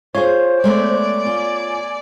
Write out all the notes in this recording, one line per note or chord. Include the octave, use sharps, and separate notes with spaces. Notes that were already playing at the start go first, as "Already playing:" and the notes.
F4 G#4 C5 C#5
G#3 A3 B3 D5
F4 G#5